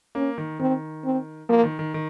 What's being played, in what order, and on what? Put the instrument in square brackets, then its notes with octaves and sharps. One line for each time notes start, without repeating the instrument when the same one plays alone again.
[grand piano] A#3 [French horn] C#4
[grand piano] D#3
[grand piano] D#3 [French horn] C4
[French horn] C4
[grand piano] F3 [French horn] A#3
[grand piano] D#3
D#3
D#3